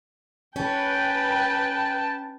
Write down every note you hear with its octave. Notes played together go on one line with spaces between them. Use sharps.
C#4 B4 G5 A5